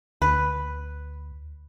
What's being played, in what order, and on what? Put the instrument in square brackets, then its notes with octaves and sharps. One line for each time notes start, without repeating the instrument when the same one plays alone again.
[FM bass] D2 [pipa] B4